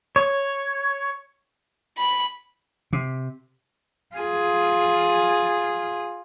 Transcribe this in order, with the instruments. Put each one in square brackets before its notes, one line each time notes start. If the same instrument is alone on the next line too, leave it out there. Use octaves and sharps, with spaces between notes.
[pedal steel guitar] C#5
[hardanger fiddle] B5
[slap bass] C3
[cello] F4 G#4